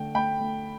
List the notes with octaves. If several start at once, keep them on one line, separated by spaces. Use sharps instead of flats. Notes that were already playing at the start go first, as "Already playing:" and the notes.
Already playing: D3 A3 G5
A3 G5 B5
A3